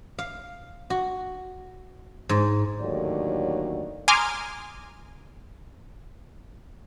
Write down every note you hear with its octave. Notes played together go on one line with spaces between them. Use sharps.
F5
F#4
G#2
D#2 A2 D3 F#3 D5
G#5 A#5 C6 D6 D#6 F6